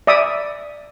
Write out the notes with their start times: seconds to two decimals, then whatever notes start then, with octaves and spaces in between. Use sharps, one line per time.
0.07 D5 E5 D#6